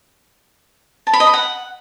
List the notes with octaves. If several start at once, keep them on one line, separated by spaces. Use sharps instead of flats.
A5
B5
D#5
B5
F#5